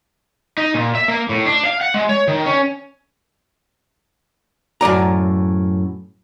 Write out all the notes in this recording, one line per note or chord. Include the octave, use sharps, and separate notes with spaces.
D#4
A#2
E5
A#3
A2
D4
F5
F#5
G#3
C#5
D#3
C#4
F#2 A2 D5 A#5